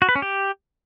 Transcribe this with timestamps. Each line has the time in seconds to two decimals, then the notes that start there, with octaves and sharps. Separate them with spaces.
0.02 F#4
0.09 B4
0.15 C#4
0.22 G4